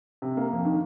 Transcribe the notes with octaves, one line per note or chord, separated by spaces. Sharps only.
C3
A#3
F2
D#3